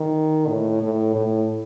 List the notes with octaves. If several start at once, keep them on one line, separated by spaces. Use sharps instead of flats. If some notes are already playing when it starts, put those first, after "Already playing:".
Already playing: D#3
A2
A2
A2